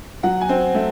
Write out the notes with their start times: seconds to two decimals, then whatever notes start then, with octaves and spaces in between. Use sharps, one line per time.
0.23 F#3 F#5
0.41 G#5
0.49 C4
0.74 A3